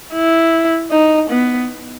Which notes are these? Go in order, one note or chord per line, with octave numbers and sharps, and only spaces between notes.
E4
D#4
B3